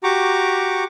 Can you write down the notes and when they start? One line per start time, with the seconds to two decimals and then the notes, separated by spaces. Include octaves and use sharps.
0.03 F#4 G4 A#5 C#6 D6